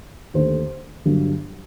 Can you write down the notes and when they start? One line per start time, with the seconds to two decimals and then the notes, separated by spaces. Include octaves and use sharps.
0.34 D#2 D3 A3 C5
1.05 G1 G2 F#3